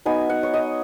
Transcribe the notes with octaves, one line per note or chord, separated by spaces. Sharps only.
F#3 B3 D#4 G#5
F#5
C#5
D#5